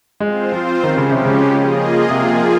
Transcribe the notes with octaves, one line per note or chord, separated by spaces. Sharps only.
G#3 C4 F4 C5
F3
D#3 F3 G#3 C#4 G4
C#3
C3
C#3
A#3 F4 G#4 D#5
C3 F3 A#3 F4 G#4